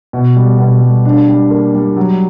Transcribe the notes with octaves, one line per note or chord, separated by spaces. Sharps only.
B2
G3
B2
G3
D4
G3
A#3
G3
F#3